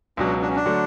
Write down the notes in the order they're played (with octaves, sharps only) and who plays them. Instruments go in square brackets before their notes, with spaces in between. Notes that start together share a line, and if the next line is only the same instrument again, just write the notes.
[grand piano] C#2 B2 F#3 [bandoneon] D4
[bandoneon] D4
C#4
D4
[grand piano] D3 F#3 A3